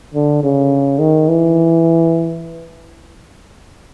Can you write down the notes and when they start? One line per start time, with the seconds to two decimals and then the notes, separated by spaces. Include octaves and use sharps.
0.14 D3
0.44 C#3
0.99 D#3
1.29 E3